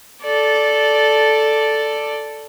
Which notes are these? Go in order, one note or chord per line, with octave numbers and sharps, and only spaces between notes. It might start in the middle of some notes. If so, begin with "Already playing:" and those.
A4 D5